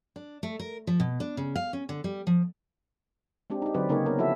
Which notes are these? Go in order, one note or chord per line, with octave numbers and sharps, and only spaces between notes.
D4
A3
A#4
F3
B2
D4
C#3
F5
C#4
D3
G3
F3
G#3 C4 D4 G4
D#4 G4
D3 F#3 C4 B4 D5
C#3 A#3 D#4 G#4 A#4 C#5
B3 C4 A#4
F3 E4 F#4 A4 E5